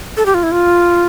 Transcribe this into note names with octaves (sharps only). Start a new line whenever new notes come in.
A4
G4
F4
E4
F4